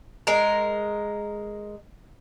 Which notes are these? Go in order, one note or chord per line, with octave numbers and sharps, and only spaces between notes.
G#3 A#4